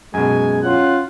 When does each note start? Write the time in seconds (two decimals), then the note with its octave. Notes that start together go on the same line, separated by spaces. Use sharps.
0.14 F#2 B2 G#3 G#5
0.63 C#4 F4 F#5